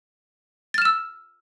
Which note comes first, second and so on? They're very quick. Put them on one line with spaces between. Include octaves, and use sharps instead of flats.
A6 F6 E7 E6